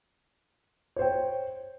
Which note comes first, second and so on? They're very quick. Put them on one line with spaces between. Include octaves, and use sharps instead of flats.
C#5 C5 G5